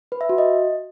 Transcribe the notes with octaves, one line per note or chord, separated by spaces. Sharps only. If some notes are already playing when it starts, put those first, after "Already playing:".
B4
E5
F#4
D#5